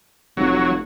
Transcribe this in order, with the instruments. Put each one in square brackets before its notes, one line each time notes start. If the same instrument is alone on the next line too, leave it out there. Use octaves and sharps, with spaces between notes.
[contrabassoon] F1 [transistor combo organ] F#3